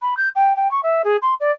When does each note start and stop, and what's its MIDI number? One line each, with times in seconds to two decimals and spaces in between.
0.02 0.17 83
0.17 0.29 91
0.35 0.56 79
0.56 0.70 79
0.71 0.81 85
0.83 1.02 76
1.04 1.17 68
1.22 1.34 84
1.40 1.51 74